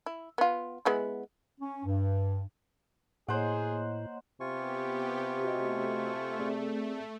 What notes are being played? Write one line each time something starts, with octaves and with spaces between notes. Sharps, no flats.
E4
B3 F4
G#3 B3 E4
C#4
G2
A2 A#3 G#4 C5 C#5 D#5 F#5
C3 B3 F4 G4 G#5 C#6
A3 F#4 D#5
C4 G#4 D5